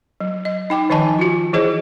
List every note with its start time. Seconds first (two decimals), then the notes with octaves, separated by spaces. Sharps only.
0.20 F#3
0.45 D#5
0.70 D#4 G5 D6
0.90 D#3 F3 D#4 D#5 G#5 A5
1.19 F4 F#4
1.53 E3 E4 G#4 C5 D#5